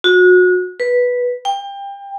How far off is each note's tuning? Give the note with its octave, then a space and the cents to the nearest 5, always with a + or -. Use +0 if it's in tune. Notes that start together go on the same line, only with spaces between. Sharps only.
F#4 -30
B4 -5
G5 +25